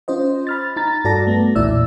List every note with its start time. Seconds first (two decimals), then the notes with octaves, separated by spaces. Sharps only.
0.08 C#4 F4 C5 D#5
0.47 B5 F6 A6
0.76 D#4 A#5 A6
1.05 G2 F#4 A4 D5 A5 A#6
1.27 A3 B3
1.55 B1 E2 A#2 E4 D5 E6